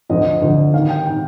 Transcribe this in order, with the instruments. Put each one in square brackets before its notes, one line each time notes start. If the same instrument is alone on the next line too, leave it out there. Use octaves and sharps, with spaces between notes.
[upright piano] D2 D3 F3 D#5
D2 D3 F3
D#2 F5
D#3
G5
D#3 G5